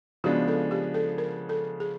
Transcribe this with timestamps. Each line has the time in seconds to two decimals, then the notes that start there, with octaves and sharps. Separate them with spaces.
0.24 C#3 F3 G#3 B3 D4 F#4
0.48 A4
0.71 G4
0.94 A4
1.18 A#4
1.49 A4
1.80 G#4